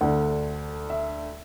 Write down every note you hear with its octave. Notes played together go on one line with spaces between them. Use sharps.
D2 D3 F#5
E5